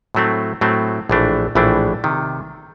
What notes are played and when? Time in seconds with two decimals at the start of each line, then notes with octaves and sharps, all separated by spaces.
0.15 A2 F#3 A3 C4
0.61 A2 F#3 A3 C4
1.09 A#1 A2 E3 A3 D4
1.55 A#1 A2 E3 A3 D4
2.04 C3 D#3